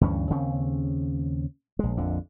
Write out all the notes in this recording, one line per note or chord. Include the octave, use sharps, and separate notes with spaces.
D2 G2 E3 C#4
D#2 C#3 C4 C#4
A#1 G#3
A#1 F2 D3